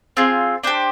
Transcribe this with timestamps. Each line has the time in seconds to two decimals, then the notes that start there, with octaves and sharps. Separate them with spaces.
0.17 C4 F4 G#4
0.64 D4 G4 C5